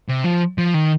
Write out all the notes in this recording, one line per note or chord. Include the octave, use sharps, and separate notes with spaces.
C3
F3
F3
D#3